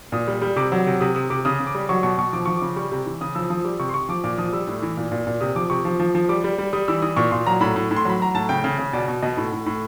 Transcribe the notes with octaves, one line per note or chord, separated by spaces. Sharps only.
A#2 D#6
G3
G3
C3 D6
F#3
C3
C3 D#6
C3 D#6
C3 D6
C#3 D#6
C#3
D6
G3
F#3 C#6
B2 C#6
B2 C#6
F3 D6
F3 C#6
C#3 D6
G3 C#6
C3
E3
C#3 D#6
F3 E6
F3 D#6
G3 D6
C3 C#6
C6
C3 C#6
F3 D6
A#2 D6
F3 D#6
G3 E6
A2
E3
A#2
A#2
A#2
C3 D#6
F3 D6
C3 C#6
F3
F3
F3
G3 D6
G3
G3
G3 D#6
E3 E6
E3 D#6
A#2 C#6
A#2 C6
F#3 A#5
A2 B5
A2
A2
C6
F#3 B5
F#3 A#5
A2 A5
C#3 G5
C#3
C#3
B2 D5
B2
B2 D#5
A2
A2
A2